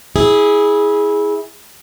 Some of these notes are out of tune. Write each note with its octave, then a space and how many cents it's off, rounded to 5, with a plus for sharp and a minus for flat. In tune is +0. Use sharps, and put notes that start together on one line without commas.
E4 -20 G#4 +0